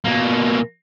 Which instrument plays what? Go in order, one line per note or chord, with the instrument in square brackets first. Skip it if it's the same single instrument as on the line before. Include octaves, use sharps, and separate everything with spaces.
[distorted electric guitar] B2 A#3